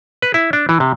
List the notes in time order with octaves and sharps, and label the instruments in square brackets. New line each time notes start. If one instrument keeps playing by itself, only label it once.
[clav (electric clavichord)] B4
E4
D4
E3
C3